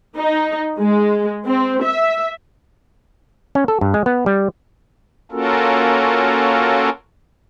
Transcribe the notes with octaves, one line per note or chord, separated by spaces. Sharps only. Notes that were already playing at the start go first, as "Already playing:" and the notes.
D#4
G#3
C4
E5
C#4
A4
G2
G#3
B3
G3
A#3 C#4 F4 F#4 A4 A#4